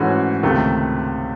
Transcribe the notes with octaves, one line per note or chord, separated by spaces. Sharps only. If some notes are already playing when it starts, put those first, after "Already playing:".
Already playing: G#2 E3 A3 C#4 F#4
C#2 C3 D#3 A3